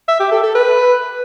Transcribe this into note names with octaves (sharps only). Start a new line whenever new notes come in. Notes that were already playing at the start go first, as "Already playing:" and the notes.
E5
G4
A4
A4
B4